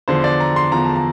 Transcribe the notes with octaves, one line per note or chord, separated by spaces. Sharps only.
E2 D3 F3 C5
D5
A#5
C6
E2 D3 F3 A#5
A5
A#5